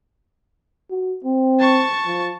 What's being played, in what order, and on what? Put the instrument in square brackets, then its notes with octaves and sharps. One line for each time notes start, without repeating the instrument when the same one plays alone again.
[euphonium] F#4
C4
[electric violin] A5 C#6
[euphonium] F3